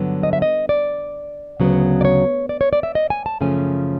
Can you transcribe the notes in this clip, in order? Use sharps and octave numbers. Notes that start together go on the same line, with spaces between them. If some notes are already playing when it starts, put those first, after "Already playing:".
Already playing: G2 D3 F#3 B3
D#5
E5
D#5
D5
D2 C#3 F#3 B3
D5
C#5
D5
C#5
D5
E5
D#5
G#5
A5
F#2 C#3 F3 A3 C#4 G#5